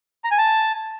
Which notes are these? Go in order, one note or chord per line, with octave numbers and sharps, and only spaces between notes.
A#5
G#5
A5